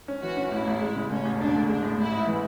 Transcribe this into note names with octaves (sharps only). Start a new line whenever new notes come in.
C#4
E3 F#4
C#4
A1 E4
A1
G#3
C#3
A1 C#4
A1
E1 D4
D2
G#3 D4
A2
A1 E4
G#2
E3